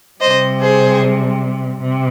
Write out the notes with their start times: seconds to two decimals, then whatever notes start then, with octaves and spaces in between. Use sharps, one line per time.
0.20 C3 G3 C5 D#5
0.61 G#4 C5
1.80 C3